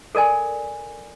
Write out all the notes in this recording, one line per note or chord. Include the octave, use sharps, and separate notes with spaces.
A4 A#4 D5 G#5